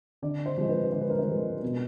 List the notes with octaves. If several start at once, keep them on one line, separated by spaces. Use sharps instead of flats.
D3 D5
C5
F3 G#3
B4
D3 C5
B4
A#4
B4
F3 G#3
B2